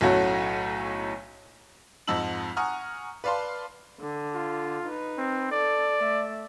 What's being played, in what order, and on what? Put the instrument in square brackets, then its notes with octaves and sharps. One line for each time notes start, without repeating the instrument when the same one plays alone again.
[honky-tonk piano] B1 A2 F#3 A3 C#4 F#4
F2 G#2 D#5 A5 E6 F#7
F#5 G#5 A#5 C#6 D#6 F6
B4 D5 F5 A5 C6
[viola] D3
[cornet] F4
[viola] D#4 B4
[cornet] C4
[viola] A4 [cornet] D5
[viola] A3 E5